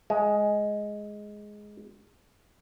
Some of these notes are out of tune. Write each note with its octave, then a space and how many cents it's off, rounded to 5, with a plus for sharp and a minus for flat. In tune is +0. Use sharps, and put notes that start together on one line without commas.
G#3 +5